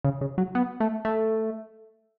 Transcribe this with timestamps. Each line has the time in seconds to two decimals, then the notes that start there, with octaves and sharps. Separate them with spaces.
0.04 C#3
0.21 C#3
0.38 F#3
0.55 B3
0.80 A3
1.05 A3